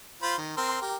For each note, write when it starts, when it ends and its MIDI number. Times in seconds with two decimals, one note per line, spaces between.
0.22 0.35 65
0.22 0.35 72
0.22 0.35 83
0.38 0.56 51
0.57 0.79 60
0.57 0.79 70
0.57 0.79 84
0.82 0.96 67
0.82 0.96 70